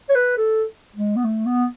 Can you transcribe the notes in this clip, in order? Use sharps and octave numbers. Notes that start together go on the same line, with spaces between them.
C#5
B4
A4
G#3
B3
A3
B3